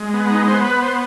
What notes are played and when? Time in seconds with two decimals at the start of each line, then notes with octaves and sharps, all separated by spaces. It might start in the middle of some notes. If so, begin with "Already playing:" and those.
Already playing: G#3
0.14 B3
0.31 D#4
0.48 B3 C5
0.65 B4
0.82 C5